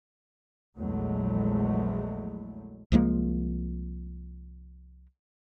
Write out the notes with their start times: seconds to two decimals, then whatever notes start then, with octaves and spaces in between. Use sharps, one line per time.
0.78 A#1 E2 F#3 G#3 A3
2.92 C2 F3 G#3 A#3